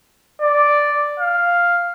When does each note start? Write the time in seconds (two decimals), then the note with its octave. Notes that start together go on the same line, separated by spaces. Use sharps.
0.42 D5
1.20 F5